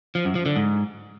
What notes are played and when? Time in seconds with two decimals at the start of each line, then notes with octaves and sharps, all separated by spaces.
0.15 F3
0.25 F#2
0.35 F3
0.46 D3
0.56 G#2